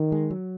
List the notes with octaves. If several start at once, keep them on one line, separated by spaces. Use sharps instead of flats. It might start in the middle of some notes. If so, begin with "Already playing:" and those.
Already playing: D#3
G#3
F#3